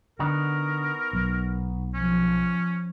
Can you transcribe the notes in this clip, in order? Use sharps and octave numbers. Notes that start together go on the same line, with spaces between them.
D3 B3 D#4 F#4 A#4
B1
F3 C#4